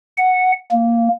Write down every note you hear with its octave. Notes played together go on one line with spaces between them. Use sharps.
F#5
A#3